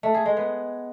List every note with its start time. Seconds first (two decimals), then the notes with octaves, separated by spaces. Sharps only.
0.03 A3
0.14 G#4
0.26 G#3
0.37 B3